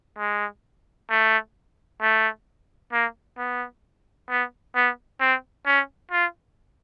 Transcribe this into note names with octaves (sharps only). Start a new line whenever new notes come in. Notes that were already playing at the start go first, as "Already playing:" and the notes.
G#3
A3
A3
A#3
B3
B3
B3
C4
C#4
F4